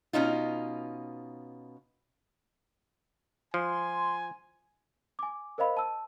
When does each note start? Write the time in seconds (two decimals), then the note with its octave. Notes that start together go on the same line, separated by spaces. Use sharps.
0.13 B2 C#4 D#4 F4
3.54 F3 G#5 C6
5.19 G#5 D6
5.58 A#4 C5 D#5 F5 B5
5.77 A5 E6